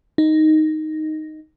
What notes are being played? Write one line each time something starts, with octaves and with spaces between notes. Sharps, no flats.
D#4